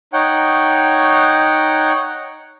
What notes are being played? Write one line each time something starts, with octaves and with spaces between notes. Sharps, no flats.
D#4 C#5 F#5 G5